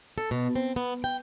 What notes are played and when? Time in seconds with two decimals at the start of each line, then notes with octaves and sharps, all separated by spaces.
0.18 A4
0.31 B2
0.56 C4
0.76 B3
1.04 G5